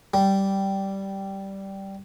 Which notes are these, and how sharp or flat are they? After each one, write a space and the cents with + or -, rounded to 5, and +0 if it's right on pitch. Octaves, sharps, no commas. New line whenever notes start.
G3 -10